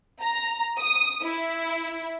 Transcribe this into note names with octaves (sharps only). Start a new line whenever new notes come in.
A#5
D#6
E4